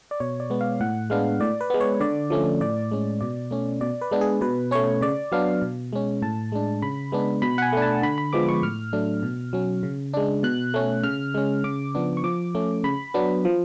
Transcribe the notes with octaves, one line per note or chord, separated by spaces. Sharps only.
D5
B2 C#5
D5
G#3 B3
F5
A2 F#5
G#3 B3 D4 F5
A2 D5
B4
G#3 B3
C#5
D3 D5
F3 A3 C#4
A2 D5
G#3 C#4
B2 D5
A3 C#4
B2 D5
B4
G#3 B3 D4
G#4
B2 B4
A3 C#4 C#5
C#3 D5
F#3 B3 D4 F5
B2
G#3 C#4
A2 A5
G#3 D4
C#3 B5
G#3 B3 D4
B2 B5
F#5
G#5
A3 D4
A5
D3 B5
B5
F3 G#3 B3 D6
C#6
A2 F6
F#3 A3 D4
B2
F#3 C#4
C#3
G#3 D4
B2 F#6
A3 C#4
C#3 F6
G#3 C#4
C#3 D6
F3 B3 D4
C#6
F3 D6
A3 C#4
C#3 B5
F#3 B3 D4
F3